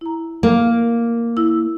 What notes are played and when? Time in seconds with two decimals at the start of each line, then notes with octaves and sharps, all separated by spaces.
0.01 E4 A#5
0.43 A#3
1.37 E4 E6